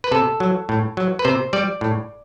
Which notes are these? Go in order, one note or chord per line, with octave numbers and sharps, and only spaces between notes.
B4
C3 A4
F#3
A2
F#3
B4
C3 C5
G3 D5
A2